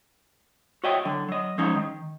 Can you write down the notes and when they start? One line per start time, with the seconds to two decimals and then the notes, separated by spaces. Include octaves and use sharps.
0.84 F#4 C#5 D#5 E5 G5
1.05 D3 F#3
1.28 F#3 D#5
1.58 F3 G#3 C#4 D#4
1.75 D#3